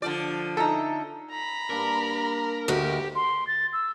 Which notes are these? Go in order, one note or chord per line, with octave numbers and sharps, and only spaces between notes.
D3 F3 D5
D#4 A4 E5 A#5
A#5 B5
G2 A#3 D4 A#4
D2 F#4 G4 D#5
C6
A6
E6